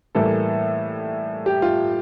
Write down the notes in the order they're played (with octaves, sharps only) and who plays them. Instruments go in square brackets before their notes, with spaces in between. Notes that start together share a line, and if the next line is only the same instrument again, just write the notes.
[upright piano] A2 E3 G3 A#3 A4
G4
F4